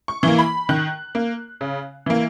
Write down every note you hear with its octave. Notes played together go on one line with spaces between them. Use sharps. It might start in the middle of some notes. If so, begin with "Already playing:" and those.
C#6
E3 A#3
B5
D#3 F#6
A#3
C#3
E3 A#3